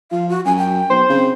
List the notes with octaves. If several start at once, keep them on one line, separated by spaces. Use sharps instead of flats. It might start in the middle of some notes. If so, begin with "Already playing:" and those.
F3 F5
F#4
F#2 G#5
G5
B1 C5
C#3 C4